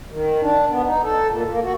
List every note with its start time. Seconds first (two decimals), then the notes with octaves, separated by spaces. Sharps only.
0.11 D#3
0.41 D4
0.70 B3
0.86 D#4
1.03 A4
1.30 A#2
1.49 A#3
1.64 F#4